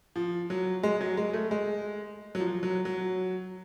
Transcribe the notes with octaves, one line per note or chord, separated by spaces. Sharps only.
F3
F#3
G#3
F#3
G#3
A3
G#3
F#3
F3
F#3
F#3